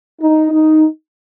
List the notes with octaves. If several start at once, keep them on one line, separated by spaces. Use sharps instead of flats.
D#4
D#4